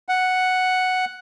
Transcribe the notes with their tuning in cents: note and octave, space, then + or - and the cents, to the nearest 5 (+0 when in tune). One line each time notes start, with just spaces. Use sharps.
F#5 +0